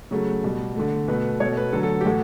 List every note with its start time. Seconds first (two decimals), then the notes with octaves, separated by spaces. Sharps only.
0.11 C#3 F#3 A3
0.44 B2 G3
0.76 D3 A3
1.08 B2 A3 B4
1.40 B2 A3 C#5
1.57 B4
1.73 D3 F#3 A3 A4
1.83 A4
2.01 G4
2.05 A2 E3 A3 F#4